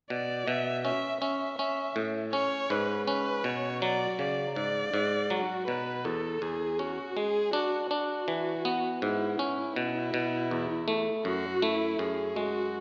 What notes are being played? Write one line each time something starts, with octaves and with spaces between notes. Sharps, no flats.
B2 D5
B2 E5
C#4 E5
C#4 E5
C#4 E5
A2
C#4 C#5
G#2 B4
C#4 B4
B2 C#5
F#3 D5
C#3 D5
G#2 D5
G#2
F#3 F#4
B2 B4
E2 A4
E2 G#4
C#4 F#4
G#3 G#4
D4 F#4
D4 F#4
E3
B3
G#2 E4
C#4 E4
B2
B2
E2
A3
F#2 F#4
A3 E4
F#2 G#4
G#3 F#4